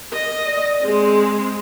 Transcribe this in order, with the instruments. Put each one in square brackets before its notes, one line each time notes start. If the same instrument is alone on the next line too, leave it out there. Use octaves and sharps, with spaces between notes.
[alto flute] A#4 [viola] D#5
[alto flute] D5
[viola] G#3 C4 [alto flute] G#4